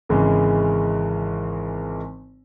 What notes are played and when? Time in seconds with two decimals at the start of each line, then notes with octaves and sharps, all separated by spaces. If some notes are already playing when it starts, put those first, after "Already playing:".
0.09 G#1 C#3 E3 G#3